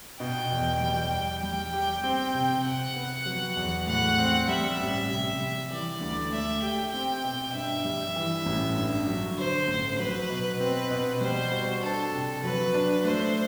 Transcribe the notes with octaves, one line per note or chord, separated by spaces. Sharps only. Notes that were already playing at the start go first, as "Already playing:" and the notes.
B2 G5
E2
G3
E2
G3 G5
G4
C4
C3
C3 F#5
B3
F#3
E2
A2 F#5
C4
G3 E5
A1
C3
G3
E3 D5
D2
A3 E5
G4 G5
C4 G5
B2
G2 E5
G3
E3
A1
G2
F#3
D3 C5
A1
F#3 B4
B2
C4 B4
B2
G3 C5
F#4
D4 A4
C3
F#3 B4
D4
A3 C5